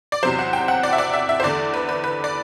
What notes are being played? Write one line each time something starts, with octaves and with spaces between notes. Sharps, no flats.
D5
E2 C3 F#3 C5
F#5
G5
F#5
D5
E5
D5
E5
E5
C5
E2 D3 A3 D5
B4
B4
B4
D5